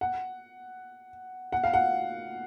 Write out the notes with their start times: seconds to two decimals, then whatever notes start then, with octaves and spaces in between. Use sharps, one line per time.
0.01 F#5
1.52 F#5
1.64 F5
1.73 F#5